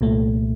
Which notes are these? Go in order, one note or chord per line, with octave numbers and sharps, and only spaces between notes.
C2 A#2 A3